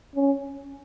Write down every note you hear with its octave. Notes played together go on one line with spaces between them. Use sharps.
C#4